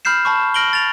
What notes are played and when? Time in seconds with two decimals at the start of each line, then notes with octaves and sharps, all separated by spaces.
0.05 B5 F6 G6 C7 E7
0.25 A5 B5 C#6
0.54 F6 A#6 D7 F#7 G7
0.73 A6 F7